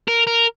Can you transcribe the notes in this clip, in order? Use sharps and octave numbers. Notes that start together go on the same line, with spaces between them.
A#4
A#4